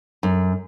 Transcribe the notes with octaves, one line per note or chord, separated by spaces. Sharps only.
F#2